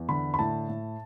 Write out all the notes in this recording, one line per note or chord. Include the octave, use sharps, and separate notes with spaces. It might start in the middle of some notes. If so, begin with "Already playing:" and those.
Already playing: E2
D3 B5
B5
A2 A5
A2